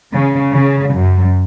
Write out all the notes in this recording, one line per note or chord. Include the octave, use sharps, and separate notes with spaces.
C#3
C#3
F#2